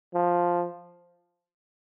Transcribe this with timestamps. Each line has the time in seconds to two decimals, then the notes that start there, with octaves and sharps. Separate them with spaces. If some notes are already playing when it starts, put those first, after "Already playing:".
0.14 F3